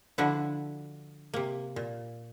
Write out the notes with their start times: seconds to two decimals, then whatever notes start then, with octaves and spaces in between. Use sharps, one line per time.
0.18 D3 F3 D4 E4 F#4
1.34 C3 A#3
1.76 A#2